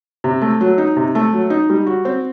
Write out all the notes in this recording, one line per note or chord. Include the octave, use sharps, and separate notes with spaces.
C3
A3
F#3
D#4
C3
A3
F#3
D#4
G3
F#4
C4